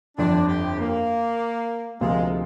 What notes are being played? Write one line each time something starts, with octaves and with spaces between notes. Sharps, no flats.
G1 F2 D3 D4
G4
A#3
D2 C3 F3 G#3 A#3 F4